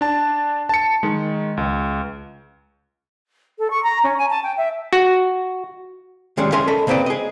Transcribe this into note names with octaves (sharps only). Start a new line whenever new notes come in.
D4 A5
A5 C#7
D#3 G#3
C#2
A4
C#6
A#5
C#4
G#5
A5
G5
E5
F#4
D#3 G3 G#3 C#4
C#4 G#4 A#4 E5 G#5 C6
A4 D#5 B5
C#3 A#3 C4 B4 D5
G#4 D#5